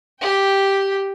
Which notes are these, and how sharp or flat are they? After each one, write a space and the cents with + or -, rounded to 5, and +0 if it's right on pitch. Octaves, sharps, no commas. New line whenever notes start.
G4 +0 G5 +0